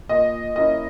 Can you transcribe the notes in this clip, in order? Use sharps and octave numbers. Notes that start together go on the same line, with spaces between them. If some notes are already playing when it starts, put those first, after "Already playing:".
A#2 D#5
A#3 C#4 E4 D#5